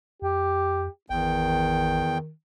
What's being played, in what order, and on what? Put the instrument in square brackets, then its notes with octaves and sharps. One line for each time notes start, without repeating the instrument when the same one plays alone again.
[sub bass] F2 [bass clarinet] G4
[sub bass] G#1 [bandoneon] E2 G5 [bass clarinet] D#3